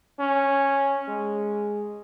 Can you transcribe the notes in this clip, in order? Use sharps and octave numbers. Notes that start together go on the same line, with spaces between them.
C#4
G#3